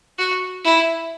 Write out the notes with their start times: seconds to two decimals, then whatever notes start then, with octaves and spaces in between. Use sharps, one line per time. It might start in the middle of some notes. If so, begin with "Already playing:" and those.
0.18 F#4
0.64 E4